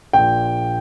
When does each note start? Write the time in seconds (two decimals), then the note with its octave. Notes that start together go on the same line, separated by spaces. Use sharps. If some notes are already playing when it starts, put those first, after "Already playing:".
0.13 A#1 A#2 G5